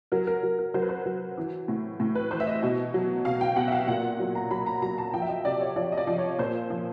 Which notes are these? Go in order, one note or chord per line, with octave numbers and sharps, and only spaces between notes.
F#3 A#4
A#4
F#3
A#4
F#3 C5
B4
C5
F#3
E3
A2
A2
B4
E3 C5
E5
D#5
B2
F#3
B2 F5
G5
B2 F#5
E5
F5
A#2 F#5
F#3
A#5
F#3 B5
A#5
F#3 A#5
A5
F3 G5
E5
D#5
C3 D5
C#5
F3 D5
D#5
D5
F3
C#5
A#2 C5
F3